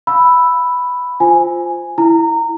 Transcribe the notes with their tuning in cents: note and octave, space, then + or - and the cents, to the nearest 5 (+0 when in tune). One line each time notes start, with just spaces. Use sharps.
F5 +15 B5 +0 E6 +0
F4 +0 C5 +0 G#5 +0
E4 +0 A#5 -20